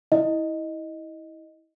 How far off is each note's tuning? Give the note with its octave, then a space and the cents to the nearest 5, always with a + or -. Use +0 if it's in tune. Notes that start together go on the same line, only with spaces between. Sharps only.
E4 -25 D#5 +0